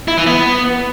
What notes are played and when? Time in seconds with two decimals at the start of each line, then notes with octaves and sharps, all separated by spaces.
0.08 E4
0.17 E3
0.27 B3